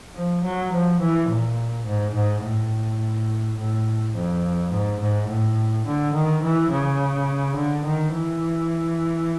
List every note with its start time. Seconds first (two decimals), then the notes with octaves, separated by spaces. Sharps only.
0.16 F3
0.44 F#3
0.73 F3
1.00 E3
1.29 A#2
1.87 G#2
2.15 G#2
2.44 A2
3.58 A2
4.15 F2
4.71 G#2
5.00 G#2
5.29 A2
5.86 D3
6.14 D#3
6.43 E3
6.71 C#3
7.56 D3
7.85 D#3
8.13 E3